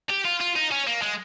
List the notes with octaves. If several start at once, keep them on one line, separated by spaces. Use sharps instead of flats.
G4
F4
F4
D#4
C#4
A#3
G#3